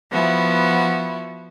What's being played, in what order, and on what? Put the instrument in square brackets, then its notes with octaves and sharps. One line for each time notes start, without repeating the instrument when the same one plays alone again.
[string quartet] F3 B3 E4 F#4